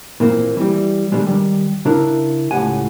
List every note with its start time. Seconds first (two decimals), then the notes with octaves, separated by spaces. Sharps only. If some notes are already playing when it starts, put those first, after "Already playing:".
0.20 A#2 E3 A#3 C4
0.57 E3 G3
1.12 B2 D3 D#3 G3 G#3
1.27 D#3 E3 G3
1.85 C#3 D4 E4 A#4
2.51 C#2 A2 D#3 G4 F#5 G#5